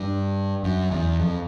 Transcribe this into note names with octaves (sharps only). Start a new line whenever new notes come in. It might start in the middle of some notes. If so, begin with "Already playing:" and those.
Already playing: G2
F#2
E2
F2